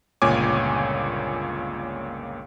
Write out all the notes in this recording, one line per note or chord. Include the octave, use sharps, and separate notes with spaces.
G1 C#2 A#2 C#5 G#5 D6